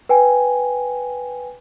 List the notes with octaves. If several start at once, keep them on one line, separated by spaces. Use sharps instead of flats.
B4 G5 G#5